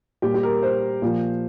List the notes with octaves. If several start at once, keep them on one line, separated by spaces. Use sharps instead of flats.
A#2 G3 G4
G4
A#4
C5
A#2 F3